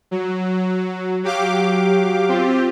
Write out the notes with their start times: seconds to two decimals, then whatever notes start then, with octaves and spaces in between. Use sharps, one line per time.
0.11 F#3
1.23 F#3 G4 F5 D6
2.29 C4 F4 G4